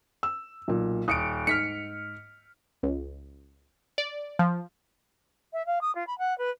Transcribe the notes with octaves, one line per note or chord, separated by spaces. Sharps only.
E6
B1 A#2
D#1 D#6 C#7 D7
G#2 F6 B6 C#7
C#2
D5
F3
E5
F5
D#6
F4
B5
F#5
B4